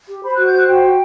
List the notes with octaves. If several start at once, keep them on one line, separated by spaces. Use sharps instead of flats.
G4
C5 B5
F#4 F#6
G6
C5 F#6
F#4 G5
F#4